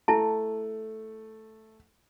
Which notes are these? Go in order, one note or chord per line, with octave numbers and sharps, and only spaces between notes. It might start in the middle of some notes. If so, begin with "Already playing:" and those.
A3 E4 A5